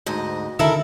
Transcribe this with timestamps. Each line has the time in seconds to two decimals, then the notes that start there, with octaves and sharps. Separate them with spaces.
0.06 D2 G#2 D#5
0.59 D3 D#3 E4 A4 A#4 E5